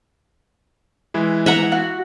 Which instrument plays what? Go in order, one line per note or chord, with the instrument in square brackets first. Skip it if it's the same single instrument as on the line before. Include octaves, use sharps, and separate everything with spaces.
[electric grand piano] E3 G#3 E4
[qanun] E5 F#5 A#5
[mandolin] F#4